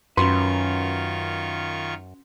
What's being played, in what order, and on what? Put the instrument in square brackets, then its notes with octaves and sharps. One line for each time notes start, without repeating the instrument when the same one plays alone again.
[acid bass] F#2 [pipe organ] D#3 F4 C#6 [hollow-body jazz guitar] C#4 F#4 B4 [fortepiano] C6